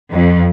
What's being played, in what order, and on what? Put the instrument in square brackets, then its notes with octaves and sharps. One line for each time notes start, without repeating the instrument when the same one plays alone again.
[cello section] F2